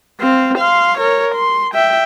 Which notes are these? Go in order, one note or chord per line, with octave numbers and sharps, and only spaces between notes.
C4 F5
F5 C6
A#4 C#5
C6
E5 G5